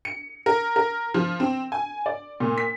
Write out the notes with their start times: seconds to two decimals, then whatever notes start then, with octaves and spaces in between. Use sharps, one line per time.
0.05 C#7
0.46 A#4
0.76 A#4
1.14 F3
1.40 C4
1.72 G#5
2.06 D5
2.40 A#2
2.58 B6